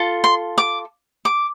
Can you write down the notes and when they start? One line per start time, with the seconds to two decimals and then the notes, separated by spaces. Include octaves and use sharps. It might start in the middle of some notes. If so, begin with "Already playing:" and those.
Already playing: F4 A4
0.24 C6
0.58 D6
1.25 D6